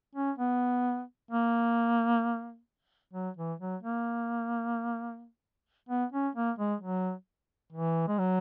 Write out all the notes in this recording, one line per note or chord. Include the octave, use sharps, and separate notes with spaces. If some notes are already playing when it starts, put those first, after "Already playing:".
C#4
B3
A#3
F#3
E3
F#3
A#3
B3
C#4
A#3
G#3
F#3
E3
G#3
F#3